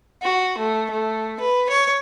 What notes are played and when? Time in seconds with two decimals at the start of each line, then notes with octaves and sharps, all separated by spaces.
0.22 F#4
0.58 A3
0.90 A3
1.40 B4
1.69 C#5